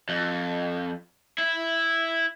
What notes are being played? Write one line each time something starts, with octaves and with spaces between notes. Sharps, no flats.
F2
E4